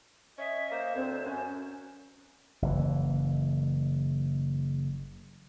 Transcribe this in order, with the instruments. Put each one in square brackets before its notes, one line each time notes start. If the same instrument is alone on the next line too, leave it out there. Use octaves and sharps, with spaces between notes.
[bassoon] C#4 [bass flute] D#5 [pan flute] E5
[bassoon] A#3 [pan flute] C5
[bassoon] D2 [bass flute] C4
[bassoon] F#2 [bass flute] C#4
[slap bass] F#1 E3